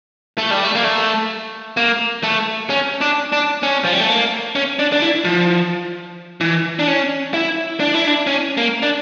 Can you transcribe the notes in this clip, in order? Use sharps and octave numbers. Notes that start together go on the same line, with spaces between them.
A3
G3
A3
A#3
A3
A#3
A3
C#4
D4
D4
C#4
F3
G3
A3
A#3
C#4
D4
D4
E4
F3
E3
D4
C#4
E4
D4
E4
D4
C#4
A#3
D4